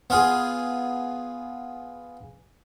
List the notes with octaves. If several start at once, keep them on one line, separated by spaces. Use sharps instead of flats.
B3 F4 G#4